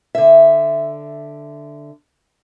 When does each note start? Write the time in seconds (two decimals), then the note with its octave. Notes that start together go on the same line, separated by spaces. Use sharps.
0.15 D3 E5